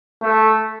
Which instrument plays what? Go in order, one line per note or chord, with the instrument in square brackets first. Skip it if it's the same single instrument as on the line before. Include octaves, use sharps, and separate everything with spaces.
[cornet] A3